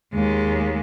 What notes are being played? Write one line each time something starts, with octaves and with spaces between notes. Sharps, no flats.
D#2 G#3